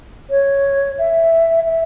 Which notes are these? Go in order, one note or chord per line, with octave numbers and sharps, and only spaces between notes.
C#5
E5
E5